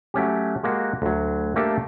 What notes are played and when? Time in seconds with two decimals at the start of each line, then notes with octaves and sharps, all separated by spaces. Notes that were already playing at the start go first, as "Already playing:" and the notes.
0.14 F#3 A3 C#4 G4
0.63 G#3 A#3 F#4 G4
1.02 D2 F#3
1.56 A3 A#3 D4 G4 A4